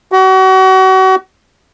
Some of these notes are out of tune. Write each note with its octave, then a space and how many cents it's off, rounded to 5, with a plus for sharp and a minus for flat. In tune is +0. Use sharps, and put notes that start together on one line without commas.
F#4 +35